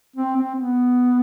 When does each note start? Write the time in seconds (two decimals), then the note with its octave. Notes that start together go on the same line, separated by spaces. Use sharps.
0.16 C4
0.36 C4
0.55 B3